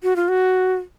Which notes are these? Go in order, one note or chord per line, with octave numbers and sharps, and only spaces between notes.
F#4
F4
F#4